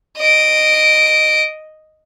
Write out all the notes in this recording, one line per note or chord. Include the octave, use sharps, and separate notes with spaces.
D#5 D7